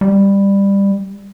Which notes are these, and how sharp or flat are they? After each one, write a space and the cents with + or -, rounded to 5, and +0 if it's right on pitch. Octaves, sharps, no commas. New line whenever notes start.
G3 +15